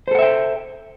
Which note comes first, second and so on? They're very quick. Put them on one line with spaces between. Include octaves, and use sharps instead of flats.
C5 A4 F#5 E5 G5